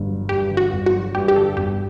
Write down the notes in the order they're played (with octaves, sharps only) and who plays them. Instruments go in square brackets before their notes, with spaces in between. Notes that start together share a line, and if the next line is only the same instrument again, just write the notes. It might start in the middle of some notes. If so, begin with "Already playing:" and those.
Already playing: [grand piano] G1 G2 D3
F#3
[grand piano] G2 [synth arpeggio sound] G4
[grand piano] D3
[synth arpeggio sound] F#4
[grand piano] G1
[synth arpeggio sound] F#4
[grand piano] F#3
[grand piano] G2 [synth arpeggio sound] G4
[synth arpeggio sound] G4
[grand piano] D3 [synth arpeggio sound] A4
[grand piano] G1 [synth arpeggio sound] G4